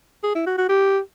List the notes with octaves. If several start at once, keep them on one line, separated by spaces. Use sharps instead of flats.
G#4
E4
F#4
F#4
G4